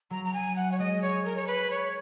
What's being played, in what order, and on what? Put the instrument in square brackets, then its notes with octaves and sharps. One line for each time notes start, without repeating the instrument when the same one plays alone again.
[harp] F#3 [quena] A#5
[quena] A#5
G#5
F#5
C#5
[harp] G#3 [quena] D#5
[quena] C#5
A#4
C#5
B4
C#5